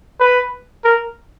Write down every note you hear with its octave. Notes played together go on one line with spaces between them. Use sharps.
B4
A#4